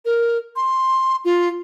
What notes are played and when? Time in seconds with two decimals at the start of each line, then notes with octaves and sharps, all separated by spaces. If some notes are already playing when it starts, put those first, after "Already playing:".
0.05 A#4
0.56 C6
1.25 F4